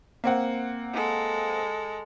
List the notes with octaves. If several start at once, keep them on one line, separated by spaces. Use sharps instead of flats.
A#3 C4 F#5
G#3 A4